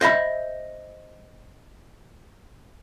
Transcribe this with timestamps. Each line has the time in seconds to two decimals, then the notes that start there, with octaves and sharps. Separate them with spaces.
0.01 C5 D#5 E5 B5